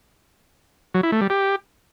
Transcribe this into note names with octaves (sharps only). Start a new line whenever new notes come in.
F#3
E4
A3
G3
G4